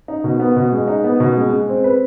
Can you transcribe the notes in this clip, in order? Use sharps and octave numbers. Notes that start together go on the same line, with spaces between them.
D#4
B2
B3
B2
G#3
D#4
B3
B2
G#3
G#3
C4
B4